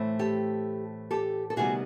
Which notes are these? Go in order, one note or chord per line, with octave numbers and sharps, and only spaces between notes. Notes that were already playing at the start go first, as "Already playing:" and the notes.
Already playing: A2 E3 A3 C4
G4 A4
G4 A4
A4
D2 C3 D#3 G3 B3 F#4 G#4